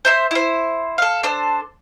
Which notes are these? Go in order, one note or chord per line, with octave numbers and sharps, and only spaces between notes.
C5 E5 C6
E4 C5
A4 F5
D4 A4 C5